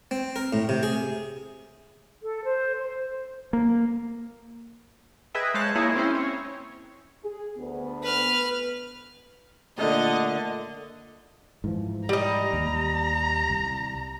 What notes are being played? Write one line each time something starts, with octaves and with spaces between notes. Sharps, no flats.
C4
A#4
A2
C3
G#4
A4
C5
C5
A#3
G#4 B4 D#5 E5 G5
G#3 C5 C#5 F5 A5 F#6
A#3 D#4 E4 G#4 C#5 D#5
C4 C#4 E4 C5
C#5
G#4
D2 B3
B4 F6
A#2 D3 A3 D#5
G#2 E3 F3
G3 D#5 A#5
D#2
C2